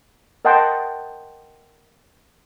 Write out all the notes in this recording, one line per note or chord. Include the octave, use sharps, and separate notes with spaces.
A#4 D#5 F#5 G5 A5 C6